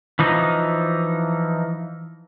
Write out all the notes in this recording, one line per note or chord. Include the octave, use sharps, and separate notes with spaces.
E3 F3 D#4